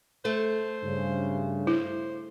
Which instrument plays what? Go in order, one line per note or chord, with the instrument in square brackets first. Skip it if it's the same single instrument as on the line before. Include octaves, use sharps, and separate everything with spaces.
[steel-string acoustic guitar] A3 [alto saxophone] C5
[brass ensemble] G2 C#3
[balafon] E4 [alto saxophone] C5